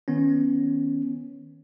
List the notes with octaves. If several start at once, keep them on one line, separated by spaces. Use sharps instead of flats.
D#3 B3 C#4